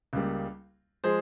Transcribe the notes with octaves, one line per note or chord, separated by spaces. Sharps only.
C#2 C#3 G3 A#3
F3 G#3 G#4 C5